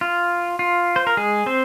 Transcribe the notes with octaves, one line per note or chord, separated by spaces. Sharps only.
F4
F4
C5
A#4
G#3 G#4
C4 C5